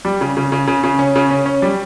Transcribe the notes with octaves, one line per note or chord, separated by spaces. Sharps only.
G3
C#3
C#3
C#3
C#3
C#3
C#4
C#3
C#4
C#4
G3